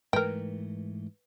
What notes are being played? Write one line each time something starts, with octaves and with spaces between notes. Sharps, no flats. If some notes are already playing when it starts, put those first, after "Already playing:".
G#2 E3 A3 A#4 B4 G5